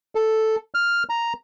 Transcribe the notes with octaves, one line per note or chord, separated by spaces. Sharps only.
A4
F6
A#5